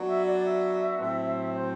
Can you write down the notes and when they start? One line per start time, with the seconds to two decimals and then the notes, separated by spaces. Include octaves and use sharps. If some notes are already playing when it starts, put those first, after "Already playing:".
Already playing: F#3 B3 D4 F#4
0.08 E5
0.26 D5
0.44 E5
0.99 A2 F#3 C4
1.53 C5